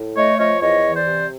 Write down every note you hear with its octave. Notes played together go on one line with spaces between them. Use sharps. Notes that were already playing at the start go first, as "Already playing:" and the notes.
Already playing: A2
A3 C#5 D#5
F3 C#5 D#5
E2 C#5 D#5
E3
C5 D5
C3